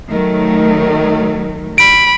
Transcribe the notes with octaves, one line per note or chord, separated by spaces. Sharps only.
D#3 F#3 A3 A#4
B5 D7